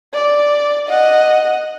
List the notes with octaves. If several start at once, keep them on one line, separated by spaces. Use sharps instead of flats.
D5
D#5 F#5